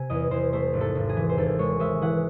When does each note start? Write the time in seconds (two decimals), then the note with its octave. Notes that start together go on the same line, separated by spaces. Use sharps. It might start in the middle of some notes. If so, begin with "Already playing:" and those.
Already playing: C3 G#5
0.10 E2 D#5
0.31 E2 C5
0.53 A3 C5
0.73 G#1
0.81 A4
0.95 G#1
1.09 G#4
1.16 E3
1.29 C5
1.37 D#2 A4
1.59 G#3 C#5
1.80 G#3 E5
2.02 E3 F#5